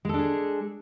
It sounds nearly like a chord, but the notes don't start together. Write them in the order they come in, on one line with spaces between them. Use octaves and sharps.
G#3 A4 D4 G#4